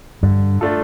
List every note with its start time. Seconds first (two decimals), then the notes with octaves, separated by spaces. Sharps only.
0.23 G2 D3
0.61 A3 D4 F4 A4